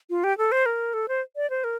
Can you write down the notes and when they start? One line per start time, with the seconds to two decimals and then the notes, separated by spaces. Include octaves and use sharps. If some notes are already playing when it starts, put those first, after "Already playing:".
0.10 F4
0.24 G4
0.38 A4
0.52 C5
0.66 A#4
0.93 A4
1.08 C5
1.36 D5
1.50 C5
1.64 A#4